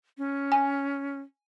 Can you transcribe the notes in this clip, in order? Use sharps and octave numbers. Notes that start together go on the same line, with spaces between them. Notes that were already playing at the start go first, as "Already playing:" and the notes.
C#4
G#5